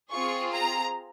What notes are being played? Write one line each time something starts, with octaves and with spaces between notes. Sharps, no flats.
C4 F4 G#4 C#6
A#5